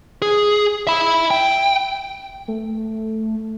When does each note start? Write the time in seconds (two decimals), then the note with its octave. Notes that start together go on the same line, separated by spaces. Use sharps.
0.22 G#4
0.87 E5 B5
1.31 G5
2.48 A3